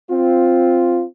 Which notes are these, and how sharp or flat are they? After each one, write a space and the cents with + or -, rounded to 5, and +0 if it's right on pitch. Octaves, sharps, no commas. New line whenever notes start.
C4 +0 F4 +0